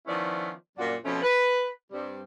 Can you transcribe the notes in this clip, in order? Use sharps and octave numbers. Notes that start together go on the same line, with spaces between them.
D#3 F3 B3 C#4 E4 D5
F#2 A#2 G3 D4 F4 F#4
B2 F3 A3 C4 C#4
B4
G2 G3 C4